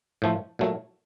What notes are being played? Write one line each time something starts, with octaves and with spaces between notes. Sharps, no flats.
A2 F3 A3
A#2 F#3 A3